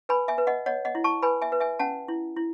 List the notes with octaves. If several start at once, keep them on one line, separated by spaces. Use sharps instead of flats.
B4 G#5 B5
E5 G#5
B4
D#5 F#5
C#5 D#5 F#5
D#5 F#5
E4
A5 C#6
B4 G#5 B5
E5 G#5
B4
E5 G#5
C#4 F#5 A5
E4
E4